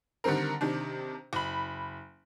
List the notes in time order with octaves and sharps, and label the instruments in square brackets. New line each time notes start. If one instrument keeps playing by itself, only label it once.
[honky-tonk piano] D3 D#3 G3 C4 A#4
C3 D#3 D4
F#1 B5